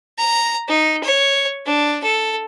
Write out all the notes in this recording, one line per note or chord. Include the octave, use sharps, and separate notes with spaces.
A#5
D#4
C#5
D4
A4